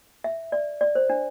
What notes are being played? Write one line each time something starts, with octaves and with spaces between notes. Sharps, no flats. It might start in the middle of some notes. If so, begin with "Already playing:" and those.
E5
D5
D5
C5
D4